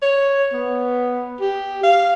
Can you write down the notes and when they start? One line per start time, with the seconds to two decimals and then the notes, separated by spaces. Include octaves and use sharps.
0.02 C#5
0.52 B3
1.40 G4
1.83 F5